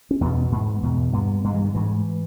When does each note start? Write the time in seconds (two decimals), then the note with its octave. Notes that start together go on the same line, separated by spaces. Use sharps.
0.11 C#4
0.21 E2 B2 B3
0.52 G#2
0.82 E2 B2
1.13 G2 B3
1.44 G2 G#3
1.54 E3
1.64 D#3
1.74 G#2 E3